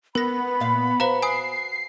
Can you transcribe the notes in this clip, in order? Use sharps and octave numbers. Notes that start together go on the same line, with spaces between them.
B3 A#4 B5 A#6
A#2 F5
F#4 B4 C5 F5 A#5
G#5 D#6 C7